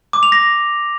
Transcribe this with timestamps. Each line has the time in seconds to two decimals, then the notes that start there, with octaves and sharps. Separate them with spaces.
0.13 D6
0.23 F7
0.32 A#6